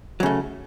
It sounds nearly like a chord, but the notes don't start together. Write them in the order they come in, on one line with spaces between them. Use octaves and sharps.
F#3 C#3 A3